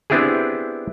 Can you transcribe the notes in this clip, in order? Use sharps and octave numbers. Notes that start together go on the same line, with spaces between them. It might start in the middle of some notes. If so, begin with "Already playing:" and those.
B3 C4 D4 E4 G4 G#4